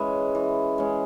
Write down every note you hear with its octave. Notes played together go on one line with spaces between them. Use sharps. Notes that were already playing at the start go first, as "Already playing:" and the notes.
Already playing: E3 G#3 C#4
E3
G#3 C#4